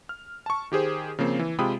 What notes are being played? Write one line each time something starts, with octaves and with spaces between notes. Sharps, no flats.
F6
A5 C#6
D#3 G4 G#4 C5
C#3 F3 A#3 C4
E3
C3 G#3 F4 G5 B5 D#6